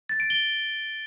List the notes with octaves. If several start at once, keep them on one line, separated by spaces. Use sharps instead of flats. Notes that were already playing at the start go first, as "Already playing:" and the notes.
A6
D7
G7